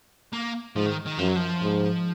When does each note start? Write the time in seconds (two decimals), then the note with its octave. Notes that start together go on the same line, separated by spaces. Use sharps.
0.33 A#3
0.76 G#2 F3
0.86 D#3
1.06 D#3
1.19 F#2 F3
1.28 F#3
1.36 F3
1.63 G#2